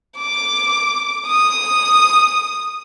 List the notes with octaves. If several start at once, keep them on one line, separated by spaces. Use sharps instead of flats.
D6
D#6